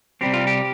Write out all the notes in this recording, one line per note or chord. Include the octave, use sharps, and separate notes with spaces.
C3 G3 C4 G4
F4
G4